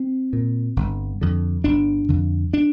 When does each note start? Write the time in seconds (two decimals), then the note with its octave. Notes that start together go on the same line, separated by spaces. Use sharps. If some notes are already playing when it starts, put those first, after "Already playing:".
Already playing: C4
0.33 A#2
0.76 G1
1.21 F2 D3
1.64 G1 D4
2.09 F2 D3
2.53 D4